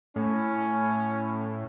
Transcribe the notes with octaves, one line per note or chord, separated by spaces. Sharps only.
A2 C#4